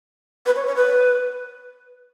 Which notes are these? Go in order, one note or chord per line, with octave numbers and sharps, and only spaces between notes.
B4
C#5
C#5
B4